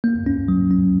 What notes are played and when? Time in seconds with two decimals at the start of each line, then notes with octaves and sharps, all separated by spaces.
0.04 A#3
0.26 C#4
0.48 F#3
0.71 C#4